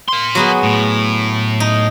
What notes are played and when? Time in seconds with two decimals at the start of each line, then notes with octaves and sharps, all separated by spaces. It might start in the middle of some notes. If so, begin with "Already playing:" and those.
0.08 A#4 C6
0.35 F#3 B3 G#4
0.63 A2
1.60 D#4